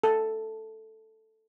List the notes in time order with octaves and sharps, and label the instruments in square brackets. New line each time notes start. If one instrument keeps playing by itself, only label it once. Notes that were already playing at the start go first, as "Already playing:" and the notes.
[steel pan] A4